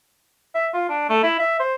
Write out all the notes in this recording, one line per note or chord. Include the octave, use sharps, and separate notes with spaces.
E5
F4
D4
A3
E4
E5
C5